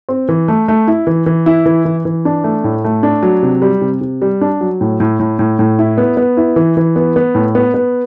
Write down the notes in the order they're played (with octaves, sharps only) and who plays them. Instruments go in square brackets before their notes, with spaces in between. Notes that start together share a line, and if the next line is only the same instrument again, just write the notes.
[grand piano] C4
E3
A3
A3
E4
E3
E3
E4
E3
E3
E3
D4
A3
A2
A3
D4
F#3
C3
G3
C3
C3
G3
D4
F#3
A2
A2
A2
A2
A2
E4
B3
B3
E4
E3
E3
B3
B3
A2
B3
B3